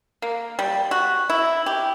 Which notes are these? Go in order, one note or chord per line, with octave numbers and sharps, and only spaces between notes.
A#3
G3
F#4
E4
G4